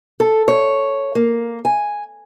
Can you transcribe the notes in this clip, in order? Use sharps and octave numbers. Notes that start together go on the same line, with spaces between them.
A4
C#5
A#3
G#5